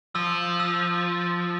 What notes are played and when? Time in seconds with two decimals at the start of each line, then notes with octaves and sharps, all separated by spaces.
0.15 F3 E6
0.60 E6